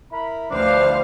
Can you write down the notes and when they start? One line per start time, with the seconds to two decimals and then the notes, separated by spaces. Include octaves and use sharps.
0.12 E4 A#4 B5
0.51 D2 E3 F3 G3 D4 C5 F5